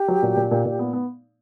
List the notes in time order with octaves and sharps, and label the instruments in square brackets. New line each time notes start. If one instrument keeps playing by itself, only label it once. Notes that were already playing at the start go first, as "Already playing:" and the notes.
Already playing: [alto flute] G4
[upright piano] F#3
A#2
A#2
A#2
A#2
B3
B3